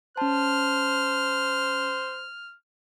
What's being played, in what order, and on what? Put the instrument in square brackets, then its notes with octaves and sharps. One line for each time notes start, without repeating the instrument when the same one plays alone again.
[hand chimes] C#4 A5 [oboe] C5 [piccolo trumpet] F6